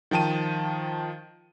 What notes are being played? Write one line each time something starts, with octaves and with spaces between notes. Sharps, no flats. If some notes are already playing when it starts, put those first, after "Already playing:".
D#3 F3 G5 A5 D#7